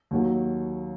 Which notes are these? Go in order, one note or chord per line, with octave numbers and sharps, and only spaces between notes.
D#2 D#3 F#3